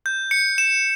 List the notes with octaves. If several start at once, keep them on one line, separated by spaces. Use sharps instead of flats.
G6
C#7
E7